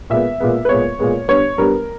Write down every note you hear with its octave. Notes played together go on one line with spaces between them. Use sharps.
A#2 G#3 B3 E5
A#2 G#3 B3
B4
A#2 G#3 B3 C#5
A#2 G#3 B3
G2 G3 B3 C#5
G2 G3 B3 A#4